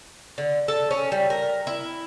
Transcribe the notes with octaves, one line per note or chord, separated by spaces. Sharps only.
D3
A4
C#4
G3
A#4
E4